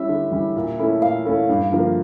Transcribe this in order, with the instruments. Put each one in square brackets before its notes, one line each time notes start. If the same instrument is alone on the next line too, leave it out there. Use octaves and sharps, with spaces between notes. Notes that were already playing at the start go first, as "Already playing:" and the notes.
Already playing: [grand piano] G3 C#4 E4 [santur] E5
[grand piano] D3
G3 C#4 E4
A#2
A3 C#4 E4 A4
[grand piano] A#2 [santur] F5
[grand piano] A3 C#4 E4 A4
G2
D3 F3 A#3